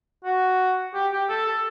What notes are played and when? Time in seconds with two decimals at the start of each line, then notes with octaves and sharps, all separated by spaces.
0.25 F#4
0.94 G4
1.12 G4
1.29 A4
1.46 A4